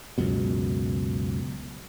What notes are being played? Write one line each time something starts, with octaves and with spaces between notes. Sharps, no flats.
C#2 F#2 B2